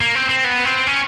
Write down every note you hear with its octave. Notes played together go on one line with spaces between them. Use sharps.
A#3
C4
C4
B3
C4
C#4